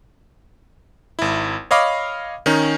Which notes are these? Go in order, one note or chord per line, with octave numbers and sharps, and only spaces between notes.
G#1 E4
C#5 D#5 F5 B5 D6
D#3 C#4 D#4